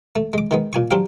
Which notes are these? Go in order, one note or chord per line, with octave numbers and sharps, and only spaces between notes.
A3
G#3 D6
D#3 G#3 B3
A#2 G#5 C#6
F#3 C4 D4 G4 F5